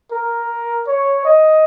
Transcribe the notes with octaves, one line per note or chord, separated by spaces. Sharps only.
A#4
C#5
D#5